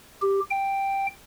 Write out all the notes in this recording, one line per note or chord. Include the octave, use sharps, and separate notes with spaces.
G4
G5